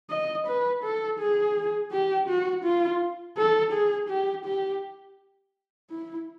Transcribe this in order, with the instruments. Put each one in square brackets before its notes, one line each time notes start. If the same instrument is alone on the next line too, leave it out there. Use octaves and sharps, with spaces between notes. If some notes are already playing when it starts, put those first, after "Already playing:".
[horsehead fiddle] D#5
B4
A4
G#4
G4
F#4
F4
A4
G#4
G4
G4
E4